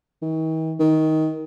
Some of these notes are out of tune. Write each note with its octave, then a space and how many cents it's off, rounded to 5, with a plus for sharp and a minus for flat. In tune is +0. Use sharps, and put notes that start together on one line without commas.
D#3 +45
D#3 +15